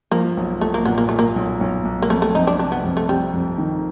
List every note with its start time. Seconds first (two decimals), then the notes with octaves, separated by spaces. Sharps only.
0.11 F3 A#3
0.37 B1
0.61 B1 A3
0.74 A#3
0.85 A#2 B3
0.98 A#3
1.09 A#2 A3
1.19 A#3
1.36 B1
1.61 B1
1.85 B1
2.02 A#3
2.09 F2 A3
2.22 A3
2.34 F2 D#4
2.47 D4
2.59 C3 D4
2.72 B3
2.84 F2
2.97 A3
3.08 F2 G3
3.33 F2
3.58 D#3